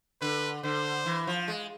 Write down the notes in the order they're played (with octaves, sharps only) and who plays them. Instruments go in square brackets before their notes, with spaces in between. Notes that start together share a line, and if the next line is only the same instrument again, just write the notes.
[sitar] D3 [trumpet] B4
[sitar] D3 [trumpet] C5
[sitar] E3
F3
G#3